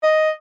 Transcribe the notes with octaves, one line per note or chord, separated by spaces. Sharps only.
D#5